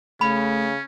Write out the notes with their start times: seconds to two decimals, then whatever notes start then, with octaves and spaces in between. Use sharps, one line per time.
0.21 C#3 A3 C#4 B5